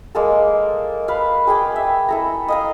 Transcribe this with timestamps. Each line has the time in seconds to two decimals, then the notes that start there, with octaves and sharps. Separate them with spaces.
0.15 G#3 A#3 A4
1.08 B4 F5
1.47 G#4 G5 G#5 D6
1.76 E5
2.09 E4 A4 A#5
2.48 D#5 F5 A#5